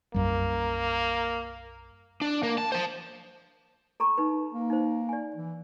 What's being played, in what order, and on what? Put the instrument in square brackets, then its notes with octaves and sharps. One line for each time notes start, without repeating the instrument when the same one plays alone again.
[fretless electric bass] B1 F#2 G3 [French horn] A#3
[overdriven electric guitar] D4
A#3
A5
C5 A5
[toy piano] A4 A#5 C#6
D#4 B4
[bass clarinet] A#3
[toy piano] D#4 C5
D5 G#5
[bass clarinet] E3